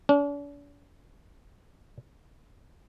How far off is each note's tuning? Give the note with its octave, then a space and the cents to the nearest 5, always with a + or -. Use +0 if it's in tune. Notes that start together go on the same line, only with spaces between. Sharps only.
D4 -45